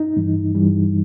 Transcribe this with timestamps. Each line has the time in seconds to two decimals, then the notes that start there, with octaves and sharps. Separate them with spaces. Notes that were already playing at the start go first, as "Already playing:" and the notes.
Already playing: D#4
0.17 G2 E3 G3
0.55 G2 E3 G3